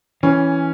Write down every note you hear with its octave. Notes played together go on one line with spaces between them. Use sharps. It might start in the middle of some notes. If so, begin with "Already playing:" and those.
E3 C#4